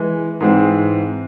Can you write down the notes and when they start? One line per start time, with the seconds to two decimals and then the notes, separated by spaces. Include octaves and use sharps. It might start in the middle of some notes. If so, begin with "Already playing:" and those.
Already playing: E3 G#3
0.40 G#2 E3 G#3 C4